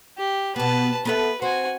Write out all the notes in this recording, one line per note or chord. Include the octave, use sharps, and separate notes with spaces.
G4
B2 B3 B4 A5
B3 A4 B4 E5
C4 F#4 G#5